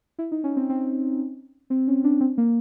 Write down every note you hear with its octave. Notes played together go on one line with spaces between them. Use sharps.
E4
D#4
C#4
C4
C4
C4
C#4
D4
C4
A#3